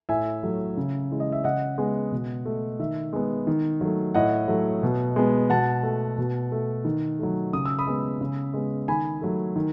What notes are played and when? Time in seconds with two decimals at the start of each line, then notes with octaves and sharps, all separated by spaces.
0.09 A2 E5 G#5
0.43 F#3 A3
0.77 C#3
1.11 E3 G#3
1.20 D#5
1.32 E5
1.44 C#3 D#5 F#5
1.78 G#3 B3
2.12 B2
2.45 A3
2.79 D#3 E5
3.13 G#3 B3
3.47 D#3
3.81 F#3 A3
4.15 A2 D#5 F#5
4.48 F#3 A3
4.83 B2
5.16 G#3 B3
5.50 B2 F#5 A5
5.83 A3
6.18 B2
6.52 A3
6.85 D#3
7.19 F#3 A3
7.53 C#3 D#6
7.66 E6
7.79 B5 D#6
7.87 G#3 B3
8.21 C#3
8.54 G#3 B3
8.88 D#3 G#5 B5
9.21 F#3 A3
9.56 D#3